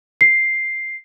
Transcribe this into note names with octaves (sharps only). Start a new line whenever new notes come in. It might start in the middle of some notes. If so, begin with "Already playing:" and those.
C7